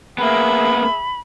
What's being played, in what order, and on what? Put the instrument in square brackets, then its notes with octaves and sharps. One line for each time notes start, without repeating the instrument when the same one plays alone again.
[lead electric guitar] A#3 B3 [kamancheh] G#4 E5 [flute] B5